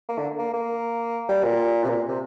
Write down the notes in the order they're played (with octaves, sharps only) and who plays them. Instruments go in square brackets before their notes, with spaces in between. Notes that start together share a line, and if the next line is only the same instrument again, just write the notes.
[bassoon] A#3
D3
A#3
A#3
G3
A#2
C3
A#2
C3